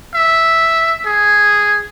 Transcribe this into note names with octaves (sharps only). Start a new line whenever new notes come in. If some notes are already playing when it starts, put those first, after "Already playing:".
E5
G#4